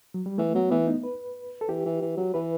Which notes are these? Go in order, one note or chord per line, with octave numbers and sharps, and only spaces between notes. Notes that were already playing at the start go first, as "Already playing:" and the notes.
F#3
G3
E3 A3
F#3 B3
E3 B3
D#4
B4
A4
E3 G4
E3
E3
F#3
E3 B4